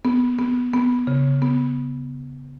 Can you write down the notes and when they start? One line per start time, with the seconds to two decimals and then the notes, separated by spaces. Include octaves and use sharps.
0.05 B3
0.38 B3
0.73 B3
1.07 C#3
1.42 B3